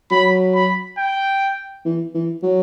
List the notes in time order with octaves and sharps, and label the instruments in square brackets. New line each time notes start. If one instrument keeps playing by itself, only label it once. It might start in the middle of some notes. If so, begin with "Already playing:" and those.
[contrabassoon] F#3 [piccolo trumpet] B5
[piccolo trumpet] B5
G5
[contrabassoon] E3
E3
F#3